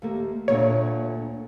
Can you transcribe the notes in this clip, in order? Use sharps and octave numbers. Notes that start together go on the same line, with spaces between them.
D#2 A3 A#3
D2 A#2 D3 C#5